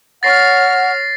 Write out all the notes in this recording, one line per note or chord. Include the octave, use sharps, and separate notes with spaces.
C#5 F#5 F6 A6 A#6 C7